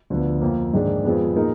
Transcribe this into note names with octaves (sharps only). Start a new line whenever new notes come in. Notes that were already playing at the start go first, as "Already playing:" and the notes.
D2 D3 F3 B3
F2 F3 A#3
G#2 D#3 G#3 D4
F2 F3 G#3 B3
A#2 G#3 D#4 A#4